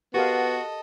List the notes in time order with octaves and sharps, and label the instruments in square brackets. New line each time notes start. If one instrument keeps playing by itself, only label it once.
[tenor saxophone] B3 [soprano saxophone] F#4 [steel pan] G4 A#4 F5 [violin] A4 D#5